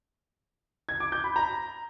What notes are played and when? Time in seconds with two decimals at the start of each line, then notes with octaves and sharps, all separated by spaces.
0.89 G#6
1.00 D6
1.12 G6
1.24 B5
1.36 A#5